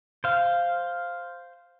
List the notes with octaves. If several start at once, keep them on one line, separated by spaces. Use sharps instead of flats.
C5 F5